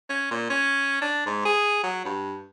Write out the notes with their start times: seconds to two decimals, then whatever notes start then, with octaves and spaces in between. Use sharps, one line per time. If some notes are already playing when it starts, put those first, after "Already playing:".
0.10 C#4
0.31 A#2
0.50 C#4
1.02 D4
1.26 G#2
1.45 G#4
1.83 F#3
2.05 G2